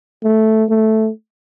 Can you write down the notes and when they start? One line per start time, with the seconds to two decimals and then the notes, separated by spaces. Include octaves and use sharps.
0.24 A3
0.69 A3